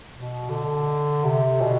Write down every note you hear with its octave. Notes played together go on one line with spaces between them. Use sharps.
B2
D3
C3
B2